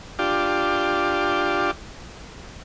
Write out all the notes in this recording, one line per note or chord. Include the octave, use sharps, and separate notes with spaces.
D4 F4 G4